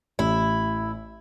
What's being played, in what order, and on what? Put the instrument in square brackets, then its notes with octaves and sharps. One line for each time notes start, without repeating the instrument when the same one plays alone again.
[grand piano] A1 [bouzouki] E4